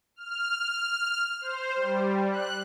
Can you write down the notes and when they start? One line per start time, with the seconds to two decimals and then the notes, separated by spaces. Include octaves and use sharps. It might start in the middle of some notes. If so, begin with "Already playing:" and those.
0.16 F6
1.41 C5
1.76 G3
2.31 F#6